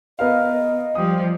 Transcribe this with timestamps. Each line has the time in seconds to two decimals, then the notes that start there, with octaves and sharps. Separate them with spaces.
0.19 B3 A#4 D#5 F5
0.95 F3 G3 G4 D#6